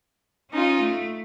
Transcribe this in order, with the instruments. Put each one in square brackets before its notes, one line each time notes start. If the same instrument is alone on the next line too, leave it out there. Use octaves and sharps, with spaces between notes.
[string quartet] C#4 D#4 F4
A3